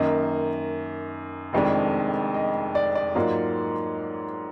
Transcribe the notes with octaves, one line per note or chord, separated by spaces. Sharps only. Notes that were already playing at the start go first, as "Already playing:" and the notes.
Already playing: F#2 D#3 A#3 D#5
F1 F2 D#3 G#3 D4
D#5
D5
D5
G#2 F#3 A#3 F4